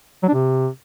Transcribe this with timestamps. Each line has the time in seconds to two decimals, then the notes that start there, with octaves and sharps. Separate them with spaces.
0.23 F#3
0.28 D4
0.34 C3